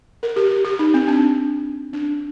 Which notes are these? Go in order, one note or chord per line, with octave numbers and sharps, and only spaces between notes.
A#4
G4
G4
G4
D#4
C4
D4
D4